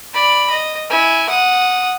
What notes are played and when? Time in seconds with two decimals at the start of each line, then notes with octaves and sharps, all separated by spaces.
0.14 D5 B5
0.51 D#5
0.90 E4 G#5
1.29 F#5 D#6